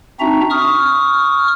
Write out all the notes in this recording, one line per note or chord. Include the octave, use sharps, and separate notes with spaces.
C4 D4 D#4 F#4 E5 A#5
C#6 D#6 F6